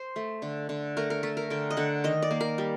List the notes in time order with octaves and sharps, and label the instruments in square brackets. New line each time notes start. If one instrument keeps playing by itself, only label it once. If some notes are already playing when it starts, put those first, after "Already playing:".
Already playing: [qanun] C5
A3
D3
D3
A3 A#4
A#4
A3 A4
A#4
D3 G5
D#5
D3 F#5
D#3 D#5
D5
A#3
A#4
G3